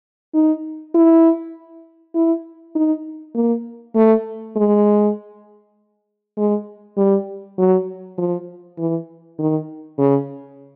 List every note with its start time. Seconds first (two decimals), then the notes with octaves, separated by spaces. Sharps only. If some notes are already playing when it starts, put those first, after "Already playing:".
0.34 D#4
0.95 E4
2.15 E4
2.75 D#4
3.35 A#3
3.96 A3
4.57 G#3
6.38 G#3
6.98 G3
7.58 F#3
8.18 F3
8.78 E3
9.39 D#3
9.99 C#3